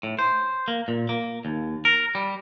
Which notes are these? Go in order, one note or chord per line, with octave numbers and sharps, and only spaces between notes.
A2
C5
A#3
A#2
A#3
D#2
A#4
G3